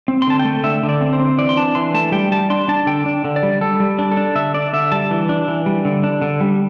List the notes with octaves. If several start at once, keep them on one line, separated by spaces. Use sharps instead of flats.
C4
C6
D3 A5
G5
A3
D3 E5
D3
D5
C4
C5
C4
E3 D5
C6
D4 A5
E3 C6
A3 A5
G3 G5
G3 A5
D4 C6
D4 A5
D3 G5
D4
D3
D5
G3
G3 A4
G3
D4
A4
D4
D3 E5
D4 D5
D3 E5
G3 A5
E3
D4
E3
G3
D3
D4
D3
G3